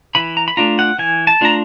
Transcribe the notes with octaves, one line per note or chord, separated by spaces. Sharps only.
E3 B5
A#5
B5
A3 D4 F4 A#5
F#5
E3 G#5
A5
A3 D4 F4 A#5